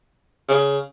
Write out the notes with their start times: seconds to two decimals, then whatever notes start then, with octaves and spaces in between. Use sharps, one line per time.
0.48 C#3